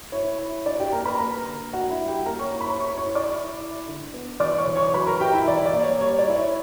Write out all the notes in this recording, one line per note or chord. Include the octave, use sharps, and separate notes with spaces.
E4 C#5
E4
D4 D5
G4 G5
A#3 A#4 A#5
B4 B5
A#3 A#4 A#5
D3
D4 F#4 F#5
E4 E5
G3
G4 G5
A#3 A#4 A#5
C#5 C#6
E4
B5
C#5 C#6
E4 C#5 C#6
C#5 C#6
E4
D5 D6
E4
E4
D3
B3
E3 D5 D6
C#5 C#6
E3
C#5 C#6
F#3 B4 B5
A#4 A#5
E4 G4 G5
E4 E5
E3 D5
D5
A#3
C#5
G3 C#5
D5
E4
C#5